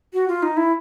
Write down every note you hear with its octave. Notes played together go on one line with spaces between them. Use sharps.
F#4
F4
D#4
E4